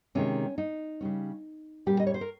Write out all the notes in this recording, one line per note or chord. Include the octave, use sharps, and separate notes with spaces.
C3 D#3 G#3 C#4
D#4
C#3 G3 C#4
A#2 G3 A#3 C#4 G4
D#5
C#5
C5
A#4